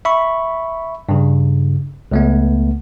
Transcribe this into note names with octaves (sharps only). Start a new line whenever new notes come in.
E5 B5 C#6
G2 C#3
C#2 A3 B3